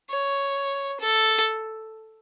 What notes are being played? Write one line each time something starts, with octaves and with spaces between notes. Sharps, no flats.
C#5
A4